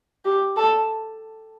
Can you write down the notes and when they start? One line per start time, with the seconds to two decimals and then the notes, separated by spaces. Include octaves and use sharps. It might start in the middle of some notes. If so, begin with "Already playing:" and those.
0.25 G4
0.57 A4